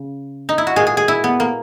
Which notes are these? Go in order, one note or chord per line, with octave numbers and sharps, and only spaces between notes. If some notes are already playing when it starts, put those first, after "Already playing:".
Already playing: C#3
D#4
E4
F#4
A#2 G#3 G#4
G#4
G#4
E4
B3
A#3